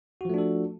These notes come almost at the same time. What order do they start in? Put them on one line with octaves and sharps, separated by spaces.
F#4 F3 A3 D4 A4